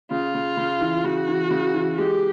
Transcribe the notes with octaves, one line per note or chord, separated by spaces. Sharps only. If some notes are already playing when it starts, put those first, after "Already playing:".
C#3 F4
C#3
C#3
E3
C#3 F#4
E3
C#3
E3
G#3 G4